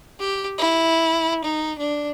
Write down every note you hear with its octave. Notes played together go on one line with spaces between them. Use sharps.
G4
E4
D#4
D4